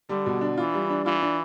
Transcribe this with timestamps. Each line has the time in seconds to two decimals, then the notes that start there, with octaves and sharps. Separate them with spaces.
0.09 D3 G3
0.26 B2
0.41 D4
0.58 E3 F4
0.74 G3
0.90 D4
1.05 E3 F4
1.22 D4